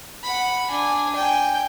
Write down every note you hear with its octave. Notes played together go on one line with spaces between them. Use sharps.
F#5 B5
D4 G#5
G5 G#5